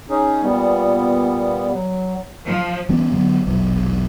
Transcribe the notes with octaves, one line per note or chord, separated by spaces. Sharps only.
C#4 D#4 G#4
A#2 G3 B3
F#3
F3
E3 G3 B3 C#4
D3 F#3 A3 B3
E1 A#1 B2 F#3